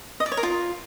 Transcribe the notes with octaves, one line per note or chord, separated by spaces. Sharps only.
D#5
D5
C#5
A#4
F4